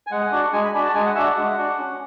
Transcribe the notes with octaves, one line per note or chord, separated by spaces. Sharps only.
G#5
G#3 F#5
D4 F#4
G#3 G#5
B5
D4 F#4 B5
A5
G#3 G#5
F#5
D4 F#4 E5
F#5
G#3
D4 F#4
C#4